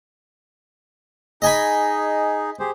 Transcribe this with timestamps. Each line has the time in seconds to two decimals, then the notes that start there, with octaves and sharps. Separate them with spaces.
1.42 D#4 G#4 D#5 G#5 B5
2.60 G4 G#4 C5